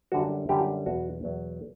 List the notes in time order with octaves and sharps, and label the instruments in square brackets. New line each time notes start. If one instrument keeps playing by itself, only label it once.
[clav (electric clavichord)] F#2 D3 G3 F#4
F#2 D3 G3 G4
E2 B2 F#3 F#4
E2 B2 F#3